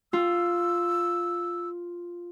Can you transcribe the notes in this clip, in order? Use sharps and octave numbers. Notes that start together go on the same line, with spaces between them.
F4 E6